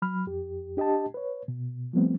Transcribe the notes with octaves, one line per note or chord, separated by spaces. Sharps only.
F#3 B5 F6
F2 G4
D4 G4 D#5 G5 A5
B4 C#5
B2
F3 G3 A3 B3 C4